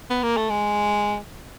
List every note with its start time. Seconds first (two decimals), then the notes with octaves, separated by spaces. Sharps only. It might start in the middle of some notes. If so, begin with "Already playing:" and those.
0.10 B3
0.23 A#3
0.37 A3
0.50 G#3